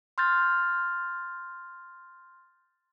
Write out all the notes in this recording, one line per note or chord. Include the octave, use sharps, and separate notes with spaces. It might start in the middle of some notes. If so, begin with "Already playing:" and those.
C6 F6 G6 A6